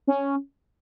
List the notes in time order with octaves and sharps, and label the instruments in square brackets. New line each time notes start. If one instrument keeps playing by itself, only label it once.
[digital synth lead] C#4